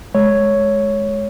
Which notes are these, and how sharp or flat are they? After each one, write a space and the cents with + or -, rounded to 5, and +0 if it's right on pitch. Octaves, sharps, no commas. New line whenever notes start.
G#3 +15 C#5 +0